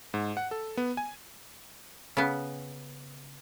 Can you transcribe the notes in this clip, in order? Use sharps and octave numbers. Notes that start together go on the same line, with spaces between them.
G#2
F#5
A4
B3
G#5
C#3 B3